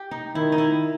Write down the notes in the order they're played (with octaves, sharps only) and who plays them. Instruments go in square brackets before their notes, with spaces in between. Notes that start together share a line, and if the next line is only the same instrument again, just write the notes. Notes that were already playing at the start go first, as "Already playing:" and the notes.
Already playing: [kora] G4
D#4
[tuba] D#3 [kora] E4
[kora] D#4
E4